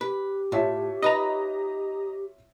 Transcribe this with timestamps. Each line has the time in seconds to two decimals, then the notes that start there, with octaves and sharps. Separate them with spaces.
0.01 G4 B4
0.52 A2 F4 C#5 E5
1.03 D#4 B4 D#5 A#5